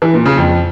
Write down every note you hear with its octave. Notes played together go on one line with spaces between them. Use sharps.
E3
A#2
C#3
F2